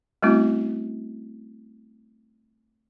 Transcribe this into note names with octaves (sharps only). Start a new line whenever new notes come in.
G3 A3 C4 C#4 E4 F#4